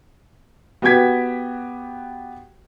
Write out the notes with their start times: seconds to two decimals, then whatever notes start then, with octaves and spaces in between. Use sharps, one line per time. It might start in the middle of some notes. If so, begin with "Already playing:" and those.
0.82 B3 F#4 G4 G5 G#6 B6